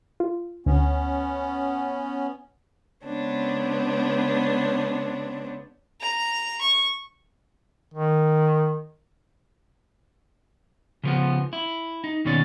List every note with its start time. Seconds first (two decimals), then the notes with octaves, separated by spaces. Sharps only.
0.20 F4
0.66 D2 B3 C#4
3.05 C#3 G#3 B3 C4 D4 C#5
6.01 A#5
6.61 C#6
7.94 D#3
11.03 C#3 F3 B3
11.53 E4
12.04 D#4
12.25 D#2 B2 D#3 C#4 D5